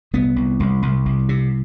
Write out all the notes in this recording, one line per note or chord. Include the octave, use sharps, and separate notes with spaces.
C2 B3
C2
C2
C2
C2
C3